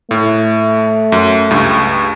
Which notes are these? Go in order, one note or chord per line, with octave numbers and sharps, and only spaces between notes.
A2 A3
F#2
C#2 G2